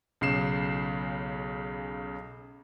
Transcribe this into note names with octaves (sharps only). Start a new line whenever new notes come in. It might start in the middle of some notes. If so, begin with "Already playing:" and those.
B1 C#3 C7 E7